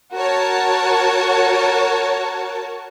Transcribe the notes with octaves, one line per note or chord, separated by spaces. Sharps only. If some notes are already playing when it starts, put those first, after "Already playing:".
F#4 A#4 C#5 A5